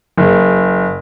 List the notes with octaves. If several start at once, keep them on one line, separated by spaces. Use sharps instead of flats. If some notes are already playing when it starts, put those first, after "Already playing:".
F#1